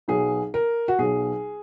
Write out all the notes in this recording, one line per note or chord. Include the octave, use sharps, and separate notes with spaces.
B1 B2 G#4
A#4
F#4
B1 B2 G#4